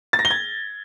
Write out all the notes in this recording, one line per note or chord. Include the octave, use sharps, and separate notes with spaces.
A6
A#6
G7
G#6